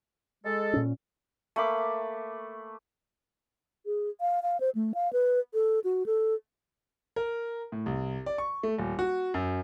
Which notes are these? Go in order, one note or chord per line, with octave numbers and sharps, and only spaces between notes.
G#3 A4
A#2 C#4
A3 A#3 B5 D6
G#4
F5
F5
C5
A3
F5
B4
A4
F#4
A4
A#4
A2
C2
D5
C#6
A3
D#1
F#4
F#2